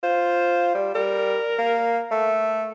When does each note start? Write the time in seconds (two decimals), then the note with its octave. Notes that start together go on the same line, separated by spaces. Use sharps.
0.03 F4 C5
0.75 G3
0.95 G3 A#4
1.59 A#3
2.11 A3